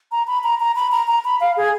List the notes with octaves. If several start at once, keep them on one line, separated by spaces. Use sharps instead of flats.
A#5
B5
A#5
A#5
B5
A#5
A#5
B5
F5
G#4